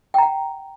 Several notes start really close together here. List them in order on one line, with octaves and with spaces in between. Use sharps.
G5 A#5 F#5